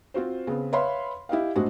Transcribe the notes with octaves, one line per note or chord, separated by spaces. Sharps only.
C4 F4 F#4 C5
C#3 B3 C4
B4 C#5 E5 F5 B5 C6
E4 G4 D#5 F5
A2 G#3 C4 D4 F#4 G#4